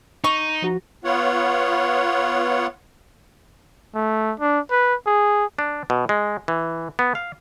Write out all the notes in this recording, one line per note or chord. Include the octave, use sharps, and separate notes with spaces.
D#4 C#6
F3 F#4
B3 F4 C#5 F#5
A3
D4
B4
G#4
D4
B2
G#3
E3
B3
F5